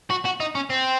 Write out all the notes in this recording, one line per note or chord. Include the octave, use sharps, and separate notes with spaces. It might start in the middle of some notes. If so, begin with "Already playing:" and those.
F#4
F#4
D#4
C#4
C4